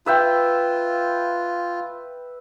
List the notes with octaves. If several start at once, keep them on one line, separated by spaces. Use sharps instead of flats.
F4 B4 E5 G5